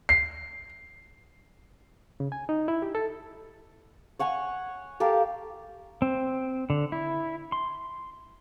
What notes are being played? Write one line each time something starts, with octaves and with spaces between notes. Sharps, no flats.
C7
C#3
G#5
D#4
E4
G4
A4
C#5 F#5 G#5 C#6
G4 A4 A#4 F5
C4
D3
E4
C6